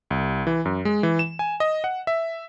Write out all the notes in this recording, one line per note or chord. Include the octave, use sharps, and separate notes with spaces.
C2
E3
F#2
G#3
E3
E7
G#5
D#5
F#5
E5